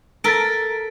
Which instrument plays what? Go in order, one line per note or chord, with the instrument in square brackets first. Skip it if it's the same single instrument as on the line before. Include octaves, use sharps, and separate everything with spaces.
[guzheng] A4 A#4 [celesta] A6 B6 D7